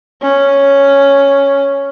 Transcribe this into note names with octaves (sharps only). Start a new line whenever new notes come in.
C#4